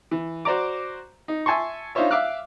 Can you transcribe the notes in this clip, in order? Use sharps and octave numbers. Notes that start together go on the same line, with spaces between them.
E3
F#4 C5 D5 A#5 D6
D#4
E5 G#5 A5 C6 C#6
D4 D#4 F4 C5 C#5 E5
E5 F5 D6 F6 F#6